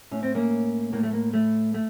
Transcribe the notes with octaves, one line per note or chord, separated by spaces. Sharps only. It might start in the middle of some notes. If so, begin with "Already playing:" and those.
A2 C#4
C4
A#3 C#4
A2 A#3
A3
A#3
A3
A3